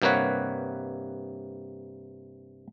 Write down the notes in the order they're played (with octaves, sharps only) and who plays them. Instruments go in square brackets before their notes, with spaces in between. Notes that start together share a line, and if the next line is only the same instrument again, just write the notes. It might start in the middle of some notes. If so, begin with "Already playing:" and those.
[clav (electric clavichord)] G2 C3 A#3 B4 C#5 F#5